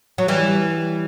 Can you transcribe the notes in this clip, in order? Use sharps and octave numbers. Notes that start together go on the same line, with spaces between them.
F#3
E3 G3